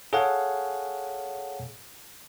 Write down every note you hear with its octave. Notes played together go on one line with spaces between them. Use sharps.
G#4 A4 C#5 F5 F#5 G#5